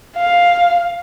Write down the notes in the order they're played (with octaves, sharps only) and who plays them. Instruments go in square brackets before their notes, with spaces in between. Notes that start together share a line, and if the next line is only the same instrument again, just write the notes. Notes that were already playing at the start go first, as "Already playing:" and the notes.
[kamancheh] F5